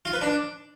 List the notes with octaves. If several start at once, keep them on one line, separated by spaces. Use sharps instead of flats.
F4
B4
D4